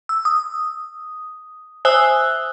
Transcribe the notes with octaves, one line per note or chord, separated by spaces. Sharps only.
E6
D#6
C5 E5 G#5 D#6 E6 F#6